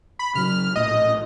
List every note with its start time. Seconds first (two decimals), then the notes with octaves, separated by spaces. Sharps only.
0.19 B5
0.35 C#3 F#3 F6
0.76 A#1 A2 D#5